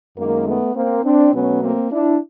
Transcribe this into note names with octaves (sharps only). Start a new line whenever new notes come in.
F#2 D#3 G#3 A#3
A3 B3
A#3 C4
C4 D4
B2 F#3 A3 B3 C#4
A#3 C4
D4 E4